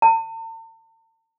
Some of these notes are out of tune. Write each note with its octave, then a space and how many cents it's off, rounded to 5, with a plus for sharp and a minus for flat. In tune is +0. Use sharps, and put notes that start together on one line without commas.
A5 +45